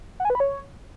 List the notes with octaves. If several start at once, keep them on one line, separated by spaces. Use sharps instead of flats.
F#5
G#5
B4
B5
C#5